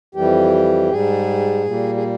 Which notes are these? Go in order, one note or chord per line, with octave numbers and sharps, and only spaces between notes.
F2 E3 G3 G4
G#2 G3 G#4
A#2 G3
G#4